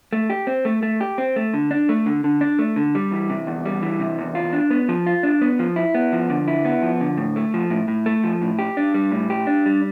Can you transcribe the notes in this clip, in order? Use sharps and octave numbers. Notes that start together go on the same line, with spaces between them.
A3
G4
C4
A3
A3
G4
C4
A3
D3
D4
A3
D3
D3
D4
A3
D3
G3
E3
C3
E2
G3
E3
C3
E2
F4
D4
B3
F3
F4
D4
B3
F3
E4
B3
F3
D3
E4
B3
F3
D3
A2
A3
F3
A2
A2
A3
F3
A2
G4
D4
G3
A2
G4
D4
G3